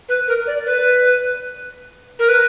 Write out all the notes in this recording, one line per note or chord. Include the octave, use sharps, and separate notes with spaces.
B4
A#4
D5
B4
A#4
B4